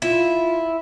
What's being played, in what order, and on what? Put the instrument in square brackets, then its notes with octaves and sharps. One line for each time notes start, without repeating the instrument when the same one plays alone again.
[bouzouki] E4 [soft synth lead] F4